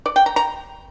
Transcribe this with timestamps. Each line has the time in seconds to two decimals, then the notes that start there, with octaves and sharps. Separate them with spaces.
0.06 D5
0.16 G5
0.26 A#5
0.36 A#5